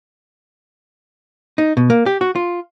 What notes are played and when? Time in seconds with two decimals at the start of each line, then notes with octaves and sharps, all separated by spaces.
1.58 D#4
1.77 B2
1.90 A#3
2.06 G4
2.21 F#4
2.36 F4